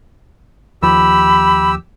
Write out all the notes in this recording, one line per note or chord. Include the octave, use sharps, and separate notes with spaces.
D#2 F3 G4 B5 E6